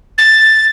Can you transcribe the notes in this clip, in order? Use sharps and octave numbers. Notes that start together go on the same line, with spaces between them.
A6